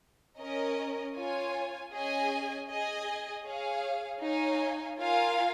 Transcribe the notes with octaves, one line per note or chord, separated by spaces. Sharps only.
C#4 A#4 D#5
F4 C#5 G#5
C#4 G#4 D#5 G#5
G#4 D#5 G#5
G#4 C#5 F5
D#4 C#5 F5 G#5
F4 A#4 F5 G#5